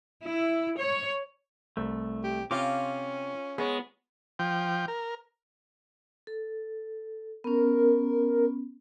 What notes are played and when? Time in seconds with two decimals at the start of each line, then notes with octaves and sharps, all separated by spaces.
0.24 E4
0.80 C#5
1.77 C2 A3
2.24 G4
2.51 C3 C4 C#4 F4 D6
3.58 G#3 B3 G#4 C#5
4.39 F3 G5
4.88 A#4
6.27 A4
7.44 B3 C#4 A#4